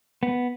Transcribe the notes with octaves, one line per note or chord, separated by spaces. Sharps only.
B3